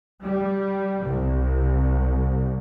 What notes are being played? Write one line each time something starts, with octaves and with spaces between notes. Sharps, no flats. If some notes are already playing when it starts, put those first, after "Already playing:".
G3
C2